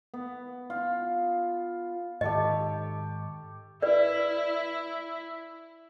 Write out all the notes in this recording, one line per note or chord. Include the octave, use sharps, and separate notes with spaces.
B3
F4
G#2 D#3 G4 A4 D#5 C#6
E4 B4 D5